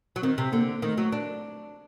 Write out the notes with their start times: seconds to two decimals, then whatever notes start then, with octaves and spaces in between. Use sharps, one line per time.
0.16 F#3
0.23 D#3 C4
0.38 C3
0.53 D3 A#3
0.82 D#3 A3
0.98 F#3
1.12 D4